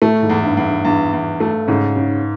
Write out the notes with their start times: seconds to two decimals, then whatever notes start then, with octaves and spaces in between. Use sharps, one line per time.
0.02 A2 A3
0.23 G#2
0.30 E2
0.44 G2
0.57 E2
0.64 G2
0.85 E2 G2
1.13 E2
1.40 A3
1.68 G#2 C#3
1.96 C#3